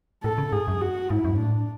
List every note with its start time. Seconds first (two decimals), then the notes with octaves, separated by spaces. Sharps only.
0.24 A2 A4
0.38 C#3
0.52 G#2 G#4
0.68 F#2
0.81 F#4
1.10 G#2 E4
1.25 F#2
1.32 G#2
1.39 A2 D4